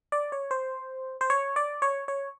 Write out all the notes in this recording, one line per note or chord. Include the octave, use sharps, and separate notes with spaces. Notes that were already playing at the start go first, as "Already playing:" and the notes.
D5
C#5
C5
C5
C#5
D5
C#5
C#5